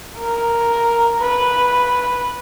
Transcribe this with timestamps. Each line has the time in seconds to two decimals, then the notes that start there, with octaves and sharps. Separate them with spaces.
0.17 A#4
1.20 B4